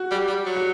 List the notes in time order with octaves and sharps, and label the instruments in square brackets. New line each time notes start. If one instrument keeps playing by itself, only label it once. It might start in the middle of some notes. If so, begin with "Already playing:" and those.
Already playing: [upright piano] F#4
[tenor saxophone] G3
G3
F#3
[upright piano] F#4